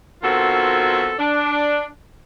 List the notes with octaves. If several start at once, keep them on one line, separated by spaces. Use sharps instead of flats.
B2 D#3 C4 F4 F#4 A4
D4